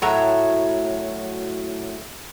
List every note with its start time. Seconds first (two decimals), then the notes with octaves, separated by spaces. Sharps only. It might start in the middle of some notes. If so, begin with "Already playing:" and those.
0.02 A2 F#3 E5 A#5